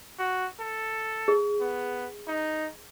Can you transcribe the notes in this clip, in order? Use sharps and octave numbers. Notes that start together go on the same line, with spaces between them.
F#4
A4
G#4
B3
D#4